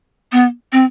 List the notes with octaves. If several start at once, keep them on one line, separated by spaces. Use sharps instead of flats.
B3
C4